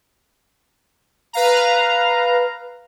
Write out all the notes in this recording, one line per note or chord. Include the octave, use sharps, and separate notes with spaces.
B4 F5 A#5